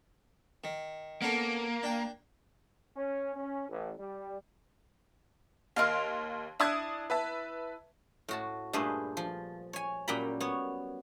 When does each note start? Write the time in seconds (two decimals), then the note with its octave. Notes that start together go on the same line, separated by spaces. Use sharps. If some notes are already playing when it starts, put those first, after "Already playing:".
0.64 D#3
1.22 A#3 B3 C#4 A4
1.83 D4 G5
2.96 C#4
3.36 C#4
3.69 A1
3.99 G3
5.76 D#2 A#4 D#5 F5 C6
6.60 D4 E4 D#6 F#6 G#6
7.10 B4 E5 A5
8.28 A2 F#4 A5
8.73 G2 A#2 A3 G#4 B4 C5
9.17 F3
9.73 C#5 G#5
10.08 F#2 A#2 G3 G5 A#5 B5
10.40 B3 C#5